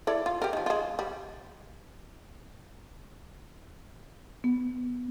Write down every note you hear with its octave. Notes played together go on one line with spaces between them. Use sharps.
E4 A4 D5
F4
G4 A#4
D#3 F3
G#3 F4
G3
B3